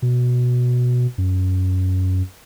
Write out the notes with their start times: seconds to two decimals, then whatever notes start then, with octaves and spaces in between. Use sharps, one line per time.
0.02 B2
1.18 F#2